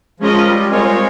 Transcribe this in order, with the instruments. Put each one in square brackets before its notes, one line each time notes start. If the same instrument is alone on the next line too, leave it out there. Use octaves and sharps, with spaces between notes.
[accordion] F3 [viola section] G#3 C#4 F4 A#4 D#5
[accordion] G3
[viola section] G3 C4 F4 A#4 C#5 [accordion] G#3